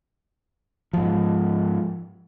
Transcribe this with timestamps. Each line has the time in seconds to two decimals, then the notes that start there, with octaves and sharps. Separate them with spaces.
0.93 G#2 F3